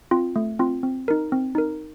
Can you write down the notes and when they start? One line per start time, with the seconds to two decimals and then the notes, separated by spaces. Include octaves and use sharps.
0.11 C4 F4
0.36 A3
0.59 C4 F4
0.83 C4
1.08 D#4 A#4
1.32 C4
1.55 D#4 A#4